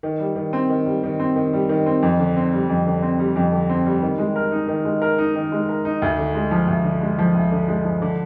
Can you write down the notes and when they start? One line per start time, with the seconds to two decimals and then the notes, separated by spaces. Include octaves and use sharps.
0.03 D#3
0.20 G3
0.36 D#3
0.53 C4
0.69 D#3
0.86 G3
1.03 D#3
1.20 C4
1.36 D#3
1.53 G3
1.69 D#3
1.86 C4
2.02 F2
2.19 D3
2.36 C4
2.52 G3
2.69 F2
2.86 D3
3.02 C4
3.19 G3
3.36 F2
3.52 D3
3.69 C4
3.86 G3
4.02 D#3
4.18 G#3
4.36 A#4
4.52 D#4
4.68 D#3
4.85 G#3
5.02 A#4
5.18 D#4
5.35 D#3
5.52 G#3
5.69 A#4
5.85 D#4
6.02 D2
6.18 D3
6.35 G#3
6.51 F3
6.68 D2
6.84 D3
7.01 G#3
7.19 F3
7.35 D2
7.52 D3
7.68 G#3
7.85 F3
8.02 D3